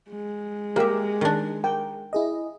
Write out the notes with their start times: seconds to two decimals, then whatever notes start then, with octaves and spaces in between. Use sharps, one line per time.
0.11 G#3
0.76 A#3 G4 A#4 E5
1.21 D#3 D4
1.64 A#4 G5
2.13 E4 G#4 D#5